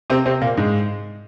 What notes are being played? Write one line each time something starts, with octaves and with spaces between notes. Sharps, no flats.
C3 C4
C3 C4
A#2 A#3
G#2 G#3